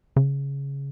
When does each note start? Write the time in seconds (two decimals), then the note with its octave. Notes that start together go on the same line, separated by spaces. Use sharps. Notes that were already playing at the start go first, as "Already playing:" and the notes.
0.16 C#3